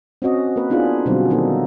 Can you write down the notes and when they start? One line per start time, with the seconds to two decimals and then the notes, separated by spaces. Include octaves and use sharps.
0.22 C4 C#4 F#4 D#5
0.56 A#3 A#4 B4
0.70 B3 D4 D#4 F4 G#4
1.06 B2 D3 F#3 G3 B3 C4
1.30 D#3 F#3 A#3 B3 D#4 A4